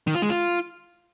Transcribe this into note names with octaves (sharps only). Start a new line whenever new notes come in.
D#3
F4
G#3
F4